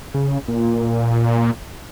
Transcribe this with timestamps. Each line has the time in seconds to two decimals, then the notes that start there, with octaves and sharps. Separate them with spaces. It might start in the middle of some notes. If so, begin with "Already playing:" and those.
0.14 C#3
0.48 A#2